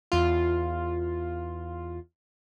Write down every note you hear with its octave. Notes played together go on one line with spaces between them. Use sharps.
E2 F4